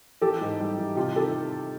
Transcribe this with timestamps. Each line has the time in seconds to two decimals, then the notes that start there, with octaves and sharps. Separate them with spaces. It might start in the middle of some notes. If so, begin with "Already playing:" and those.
0.21 E3 G4 A4
0.41 G#2
0.60 G3
0.78 E3
0.96 C3 F4 G4
1.15 D#3 G4 A4